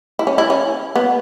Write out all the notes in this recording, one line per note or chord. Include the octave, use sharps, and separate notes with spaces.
E4
C#4
E4
C#4
B3